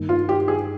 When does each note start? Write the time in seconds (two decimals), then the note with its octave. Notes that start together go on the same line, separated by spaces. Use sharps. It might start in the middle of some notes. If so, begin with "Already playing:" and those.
Already playing: G2 D#3 A#3
0.09 F4
0.29 G4
0.48 G#4